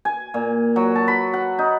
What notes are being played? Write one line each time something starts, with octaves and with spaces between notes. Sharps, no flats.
G#5
A#2
F#3
A5
B5
F#5
D#4